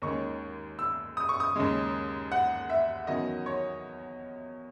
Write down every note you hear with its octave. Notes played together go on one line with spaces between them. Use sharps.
D#2 D#3 G#3 C#4 C#6
E6
D#6
C#6
D#6
D#2 C#3 G#3
F#5
E5
E2 D#3 F#3 C#4 D#5
C#5